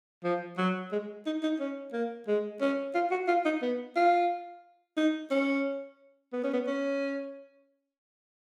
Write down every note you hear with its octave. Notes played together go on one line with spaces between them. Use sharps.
F3
F#3
G#3
D#4
D#4
C#4
A#3
G#3
C#4
F4
F#4
F4
D#4
B3
F4
D#4
C#4
B3
C#4
B3
C#4